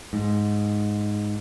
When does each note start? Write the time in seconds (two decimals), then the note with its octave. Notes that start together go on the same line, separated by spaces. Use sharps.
0.13 G#2